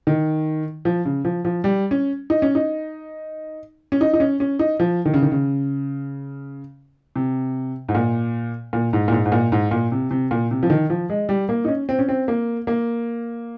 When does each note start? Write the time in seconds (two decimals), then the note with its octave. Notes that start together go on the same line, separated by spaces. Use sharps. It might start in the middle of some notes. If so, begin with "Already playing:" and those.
0.07 D#3
0.85 F3
1.05 C#3
1.25 F3
1.45 F3
1.64 G3
1.91 C#4
2.30 D#4
2.42 C#4
2.55 D#4
3.92 C#4
4.01 D#4
4.13 D#4
4.20 C#4
4.40 C#4
4.59 D#4
4.80 F3
5.05 D#3
5.14 C#3
5.22 D#3
5.32 C#3
7.16 C3
7.89 G#2
7.95 A#2
8.73 A#2
8.93 G#2
9.08 A#2
9.12 G#2
9.26 G#2
9.32 A#2
9.52 G#2
9.71 A#2
9.92 C3
10.11 C3
10.31 A#2
10.51 C3
10.63 F3
10.70 D#3
10.90 F3
11.10 G#3
11.29 G3
11.49 A#3
11.65 D#4
11.68 C#4
11.89 C4
11.99 C#4
12.09 C4
12.28 A#3
12.67 A#3